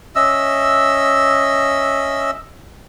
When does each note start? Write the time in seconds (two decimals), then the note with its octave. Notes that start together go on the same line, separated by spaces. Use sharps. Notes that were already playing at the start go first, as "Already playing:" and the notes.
0.16 C#4 D#5 E5 E6